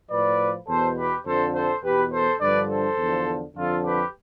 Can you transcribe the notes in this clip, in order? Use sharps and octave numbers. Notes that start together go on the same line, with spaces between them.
A2 F3 B4 D5
E2 B2 A4 C5
G4 B4
F2 D3 F3 A4 C5
A4 C5
E2 B2 G4 B4
A4 C5
G2 D3 F3 B4 D5
A4 C5
E2 D3 F3
F2 D3 F3 F4 A4
G4 B4